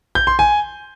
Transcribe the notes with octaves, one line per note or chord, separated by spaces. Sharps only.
G6
C6
G#5